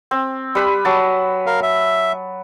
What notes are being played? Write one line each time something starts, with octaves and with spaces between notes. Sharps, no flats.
C4
G3 B4 B5
F#3 A5
A#4 F5
E5